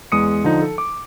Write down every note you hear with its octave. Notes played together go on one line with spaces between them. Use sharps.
E2 G#3 D#6 C#7
D3 F3 D#4
A4
D6